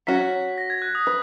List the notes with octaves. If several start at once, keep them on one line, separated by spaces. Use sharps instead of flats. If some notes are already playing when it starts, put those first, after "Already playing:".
F#3 C#4 F#4 B6
A#6
G#6
F#6
D#6
B4